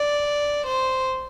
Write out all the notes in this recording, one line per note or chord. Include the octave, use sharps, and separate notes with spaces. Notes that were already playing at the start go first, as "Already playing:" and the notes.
Already playing: D5
C5